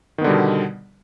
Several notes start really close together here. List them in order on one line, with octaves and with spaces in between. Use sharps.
D#3 B3 D3 G3 B2